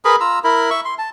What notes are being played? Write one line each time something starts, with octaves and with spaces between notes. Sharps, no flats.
G#4 A#4 B4 B5
F4 A#5 E6
E4 A#4 B5
E5 C#6
C6
A5